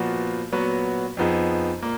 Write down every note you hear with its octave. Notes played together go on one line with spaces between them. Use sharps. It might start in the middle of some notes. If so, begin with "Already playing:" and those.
Already playing: A#2 F3 B3 F#4
A#2 F#3 B3 F#4
F2 F3 B3 D#4 G#4
A#2 A#3